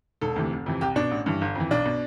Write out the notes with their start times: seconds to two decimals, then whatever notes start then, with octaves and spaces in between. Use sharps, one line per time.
0.21 E1 A4
0.36 D2 C3 E3
0.51 F1
0.66 F2 C3 E3
0.81 C2 G4
0.96 B2 D4
1.11 A1
1.26 G2 E3
1.41 G1
1.55 F2 E3
1.71 B1 D4
1.86 B2